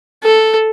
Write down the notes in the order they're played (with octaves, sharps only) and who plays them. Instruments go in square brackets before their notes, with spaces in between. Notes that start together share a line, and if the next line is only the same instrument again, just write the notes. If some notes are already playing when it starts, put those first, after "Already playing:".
[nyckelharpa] A4